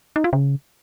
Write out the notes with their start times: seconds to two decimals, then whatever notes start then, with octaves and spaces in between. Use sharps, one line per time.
0.16 D#4
0.24 F4
0.33 C#3